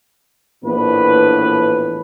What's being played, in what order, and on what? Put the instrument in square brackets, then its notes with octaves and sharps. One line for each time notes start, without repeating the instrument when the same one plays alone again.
[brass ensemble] A#1 A2 E3 B3 D4 B4